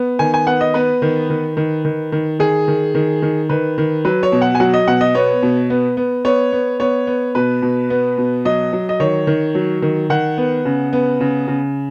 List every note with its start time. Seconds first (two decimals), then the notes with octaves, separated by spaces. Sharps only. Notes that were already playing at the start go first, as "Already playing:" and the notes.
Already playing: B3
0.19 D#3 G#5
0.34 G#5
0.47 B3 F#5
0.61 D#5
0.74 B3 B4
1.02 D#3
1.30 D#3
1.57 D#3
1.85 D#3
2.12 D#3
2.39 D#3 G#4
2.68 D#3
2.95 D#3
3.22 D#3
3.49 D#3 B4
3.78 D#3
4.05 F#3 B4
4.23 C#5
4.32 B2
4.42 F#5
4.55 G#5
4.60 F#3 F#5
4.74 D#5
4.87 B2 F#5
5.01 D#5
5.15 B3 C#5
5.43 B2
5.70 B3
5.97 B3
6.25 B3 C#5
6.53 B3
6.80 B3 C#5
7.07 B3
7.35 B2 B4
7.62 B2
7.90 B3
8.18 B2
8.45 F#3 D#5
8.73 F#3
8.89 D#5
9.00 D#3 C#5
9.27 D#3
9.55 F#3
9.82 D#3
10.10 D#3 F#5
10.38 B3
10.65 C#3
10.93 B3
11.20 C#3
11.48 C#3